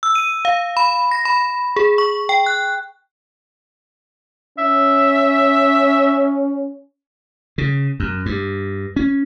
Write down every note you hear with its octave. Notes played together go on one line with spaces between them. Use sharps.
E6
D#7
F5
B5
A#6
B5
G#4
C#6
G5
F#6
C#4 E5
C#3
F#2
G2
C#4